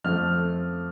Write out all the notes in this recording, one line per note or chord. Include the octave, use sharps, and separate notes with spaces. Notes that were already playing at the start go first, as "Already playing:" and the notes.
F2 F3 A3 F6